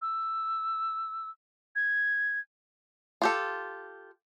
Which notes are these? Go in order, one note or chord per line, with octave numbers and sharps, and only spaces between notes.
E6
G#6
F4 G4 A4